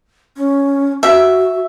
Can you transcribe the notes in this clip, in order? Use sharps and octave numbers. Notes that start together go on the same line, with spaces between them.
C#4
F#4 E5